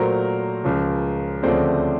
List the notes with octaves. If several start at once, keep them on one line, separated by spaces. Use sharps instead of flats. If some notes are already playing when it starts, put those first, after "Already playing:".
Already playing: A#2 F#3 A3 A#4 C5
C#2 C#3 F3
D2 C#3 F3 A3 C4 C5 D5